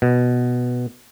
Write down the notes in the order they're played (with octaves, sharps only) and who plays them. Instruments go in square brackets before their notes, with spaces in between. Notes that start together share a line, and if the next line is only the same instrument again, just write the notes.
[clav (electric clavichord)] B2